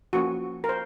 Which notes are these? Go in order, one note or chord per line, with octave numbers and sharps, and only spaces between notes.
F3 A#3 C#4 F#4
A#4
C5